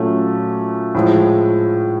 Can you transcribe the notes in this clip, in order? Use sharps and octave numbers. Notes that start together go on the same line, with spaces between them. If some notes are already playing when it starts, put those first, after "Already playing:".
Already playing: A#2 F#3 A3 C#4
A2 F3 G#3